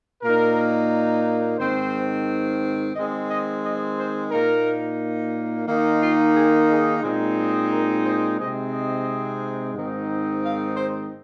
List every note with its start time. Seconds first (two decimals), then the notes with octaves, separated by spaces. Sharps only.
0.23 A#2 A#3 D#4 A#4
1.59 G#2 D#3 C4 C5
2.95 D#3 G#3 C4 D#5
3.30 D#5
3.63 D#5
3.97 C5
4.31 A#2 A#3 D#4 A#4
5.67 D#3 A#3 D#4
6.01 F4
6.35 G#4
6.69 G#4
7.03 A#2 G#3 C4 D#4
7.71 A#4
8.05 C5
8.39 C3 G#3 C4 D#4 D#5
8.73 D#5
9.74 G#2 D#3 C4 D#4
10.43 F5
10.77 C5